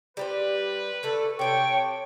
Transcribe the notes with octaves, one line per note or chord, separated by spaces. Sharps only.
G3 G4 B4 C5
D3 A3 A4 D5
C3 G4 A4 C#5 G5 C#6